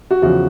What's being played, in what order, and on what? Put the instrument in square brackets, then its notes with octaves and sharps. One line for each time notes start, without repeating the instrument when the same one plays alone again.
[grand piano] F#4
[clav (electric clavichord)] E2 C#3 F3 [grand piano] F#4